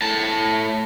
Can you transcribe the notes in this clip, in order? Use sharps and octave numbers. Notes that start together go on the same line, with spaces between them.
A2 A5